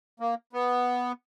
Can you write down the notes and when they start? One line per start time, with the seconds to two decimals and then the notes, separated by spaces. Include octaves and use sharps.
0.20 A#3
0.53 B3